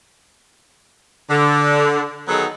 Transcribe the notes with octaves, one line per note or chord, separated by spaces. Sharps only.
D3
D#3 F#3 B3 D#4 G#4 A4